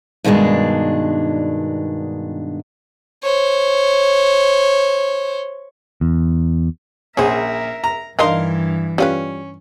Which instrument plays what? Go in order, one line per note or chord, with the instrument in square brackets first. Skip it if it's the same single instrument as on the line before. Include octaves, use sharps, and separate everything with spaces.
[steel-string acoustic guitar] G2 B2 D#3 G#3 D4
[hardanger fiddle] C5 C#5
[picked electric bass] E2
[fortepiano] A#1 G#4 [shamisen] C#4 C5 [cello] A#4 E5
[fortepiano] A#5
[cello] G2 E3 [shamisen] D4 D#4 D#5 [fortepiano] A#4 F5 C6
[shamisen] G3 F4 B4 [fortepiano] C#4